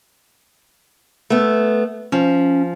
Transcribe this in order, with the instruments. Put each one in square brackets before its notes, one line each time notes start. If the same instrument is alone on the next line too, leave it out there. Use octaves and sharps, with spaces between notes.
[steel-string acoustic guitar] A3 B3
[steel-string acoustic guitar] F3 [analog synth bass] C#4